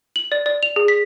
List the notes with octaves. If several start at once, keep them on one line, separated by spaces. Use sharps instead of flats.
F#7
D5
D5
F7
G#4
B6